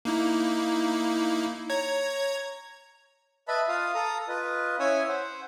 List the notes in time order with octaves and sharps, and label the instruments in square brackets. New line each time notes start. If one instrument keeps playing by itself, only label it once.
[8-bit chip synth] A#3 D#4 E4
C#5 A#5 G#6
[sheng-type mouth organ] B4 D#5 E5 A5 B5
F4 F5 D#6
A4 A#5 D#6
F4 B4 D#5
C#4 E4 C#5 G#5 D#6 E6
C5 F#5